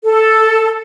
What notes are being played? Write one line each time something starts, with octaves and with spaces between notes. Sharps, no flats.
A4